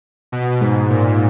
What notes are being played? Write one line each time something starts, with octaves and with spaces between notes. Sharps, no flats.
B2
G#2
A#2